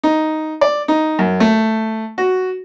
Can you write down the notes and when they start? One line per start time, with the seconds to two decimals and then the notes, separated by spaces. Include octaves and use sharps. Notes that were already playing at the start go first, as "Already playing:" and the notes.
0.04 D#4
0.61 D5
0.88 D#4
1.19 F#2
1.40 A3
2.18 F#4